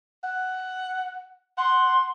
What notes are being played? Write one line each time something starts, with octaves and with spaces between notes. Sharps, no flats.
F#5
F#5 C6